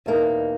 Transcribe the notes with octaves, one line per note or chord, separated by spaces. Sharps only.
E2 B2 A#3 D#4